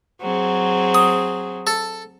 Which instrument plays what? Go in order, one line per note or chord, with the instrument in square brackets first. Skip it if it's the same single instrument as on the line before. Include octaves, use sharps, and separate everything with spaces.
[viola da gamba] F#3 C4 G#4
[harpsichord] D#6
A4